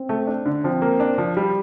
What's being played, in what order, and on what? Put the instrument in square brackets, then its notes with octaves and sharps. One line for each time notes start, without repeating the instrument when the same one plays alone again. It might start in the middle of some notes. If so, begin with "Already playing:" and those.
Already playing: [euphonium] C4
[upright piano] A3
D4
D3
[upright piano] F3 [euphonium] C4
[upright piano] A#3
D4
F3
G3